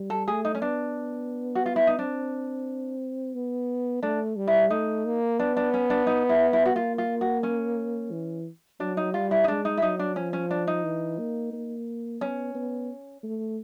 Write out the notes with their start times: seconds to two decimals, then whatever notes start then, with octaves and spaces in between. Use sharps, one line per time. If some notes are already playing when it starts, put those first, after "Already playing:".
Already playing: G3
0.10 A4
0.28 A3 G#4
0.45 D#4
0.55 C#4
0.62 B3 D4
1.55 F#4
1.66 F4
1.76 E4
1.87 D#4
1.98 C4 D4
3.34 B3
4.03 A3 D4
4.36 G3
4.48 E4
4.70 A3 D#4
5.05 A#3
5.39 B3 D4
5.57 D4
5.74 C#4
5.90 D4
6.07 D#4
6.29 E4
6.53 E4
6.65 F#4
6.75 A#3 F4
6.98 F4
7.21 F#4
7.43 C#4
8.11 E3
8.80 F#3 D4
8.97 D#4
9.14 G3 F4
9.31 E4
9.44 D#4
9.48 G#3 D4
9.65 D#4
9.77 E4
9.82 F#3 D#4
9.99 D4
10.16 F3 C#4
10.33 C#4
10.51 D4
10.67 D#4
10.84 E3
11.19 A#3
11.53 A#3
12.21 B3 C#4
12.55 B3
13.23 A3